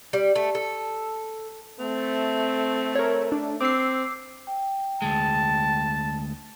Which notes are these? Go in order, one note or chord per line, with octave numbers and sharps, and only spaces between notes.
G3
A3
A4
A3 C4
A#4 C#5
D4
C4 D6 E6 C7
G5
D2 G#3 A5